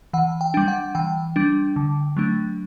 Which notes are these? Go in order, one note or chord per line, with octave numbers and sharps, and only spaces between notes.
E3 F#5
G5
G3 D4
F#5
E3 G5
G3 D4
D3
F#3 A3 D4